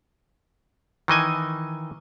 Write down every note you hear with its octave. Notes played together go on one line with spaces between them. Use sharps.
D#3 E3 D#5 G#5